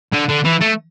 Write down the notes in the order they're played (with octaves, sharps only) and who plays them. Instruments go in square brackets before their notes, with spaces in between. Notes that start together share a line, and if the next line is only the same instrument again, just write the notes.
[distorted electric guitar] D3
D3
E3
A3